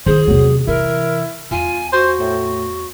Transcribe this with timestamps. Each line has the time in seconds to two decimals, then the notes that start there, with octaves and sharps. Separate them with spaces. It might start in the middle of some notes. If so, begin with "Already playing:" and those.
0.06 D#3 E4 G#4 C5
0.27 E2 C3 F#3
0.67 C3 E3 E4 A#4
1.51 E2 F4 G#5
1.93 F#4 C5
2.20 A2